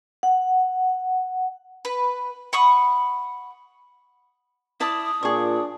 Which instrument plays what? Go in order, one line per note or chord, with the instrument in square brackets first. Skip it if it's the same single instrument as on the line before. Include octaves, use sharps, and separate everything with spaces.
[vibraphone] F#5
[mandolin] B4
F#5 B5 C#6 D#6
[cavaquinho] E4 D5 A5 [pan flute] D#6
[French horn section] A#2 [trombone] D4 [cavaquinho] G#4 C#6